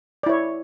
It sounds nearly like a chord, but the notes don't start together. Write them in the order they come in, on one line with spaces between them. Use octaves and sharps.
D5 E4 C#5